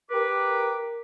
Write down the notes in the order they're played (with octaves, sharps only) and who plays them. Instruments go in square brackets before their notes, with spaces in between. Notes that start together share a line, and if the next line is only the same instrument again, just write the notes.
[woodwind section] G4 B4 D6 [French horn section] A#4